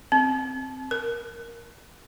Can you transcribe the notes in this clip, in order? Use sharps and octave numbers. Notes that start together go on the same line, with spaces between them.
C4
A#4